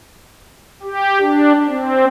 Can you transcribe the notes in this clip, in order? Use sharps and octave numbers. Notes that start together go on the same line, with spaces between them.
G4
D4
C4